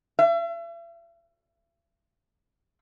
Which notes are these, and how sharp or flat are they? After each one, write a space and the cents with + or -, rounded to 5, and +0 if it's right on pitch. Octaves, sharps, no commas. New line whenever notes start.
E5 +40